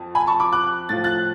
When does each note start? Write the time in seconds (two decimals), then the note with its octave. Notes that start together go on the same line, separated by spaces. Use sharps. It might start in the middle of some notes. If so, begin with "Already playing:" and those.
Already playing: F2 F3
0.15 G#5 B5
0.27 A5 C#6
0.40 B5 D6
0.52 D6 F#6
0.89 A2 F3 A6
1.04 F#6 A6